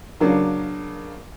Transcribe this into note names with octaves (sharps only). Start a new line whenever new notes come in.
C#3 F#3 A#3 D4